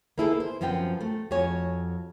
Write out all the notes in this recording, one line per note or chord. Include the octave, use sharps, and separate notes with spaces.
A#3 B3 E4 G#4 A4
C5
F#2 F3 B3 C4 G5
A3
F2 F#4 C#5 G#5